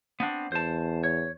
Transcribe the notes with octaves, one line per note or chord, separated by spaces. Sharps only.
B3 C4 D4
E2 C5 A5
C#5